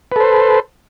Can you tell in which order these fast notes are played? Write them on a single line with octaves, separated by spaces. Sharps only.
B4 A4 C5